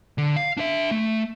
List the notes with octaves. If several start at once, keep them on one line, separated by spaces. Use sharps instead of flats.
D3
F5
D4 E5
A3